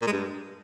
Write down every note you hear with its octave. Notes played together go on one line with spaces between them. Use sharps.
A#2
G#3
G2